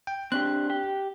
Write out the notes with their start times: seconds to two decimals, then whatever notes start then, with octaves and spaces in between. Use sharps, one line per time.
0.07 G5
0.32 C4 D4 G4 F#6
0.70 G4